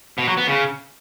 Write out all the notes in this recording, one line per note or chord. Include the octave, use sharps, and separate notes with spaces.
B2
F#3
B3
C#3